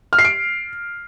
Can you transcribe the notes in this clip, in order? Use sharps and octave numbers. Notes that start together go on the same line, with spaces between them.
F6
C7
D7